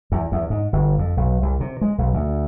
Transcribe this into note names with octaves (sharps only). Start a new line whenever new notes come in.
E2
E2
G#2
G1
F2
B1
C2
C3
G#3
B1
D2